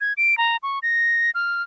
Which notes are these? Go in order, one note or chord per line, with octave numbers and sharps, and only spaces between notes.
G#6
D7
A#5
C#6
A#6
F6